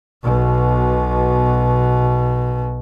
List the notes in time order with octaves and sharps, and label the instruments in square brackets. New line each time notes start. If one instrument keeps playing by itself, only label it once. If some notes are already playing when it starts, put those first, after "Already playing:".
[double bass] B1 B2